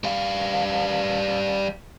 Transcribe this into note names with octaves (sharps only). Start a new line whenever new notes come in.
G3 F5